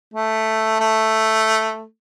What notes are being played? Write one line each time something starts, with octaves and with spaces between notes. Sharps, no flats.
A3
A3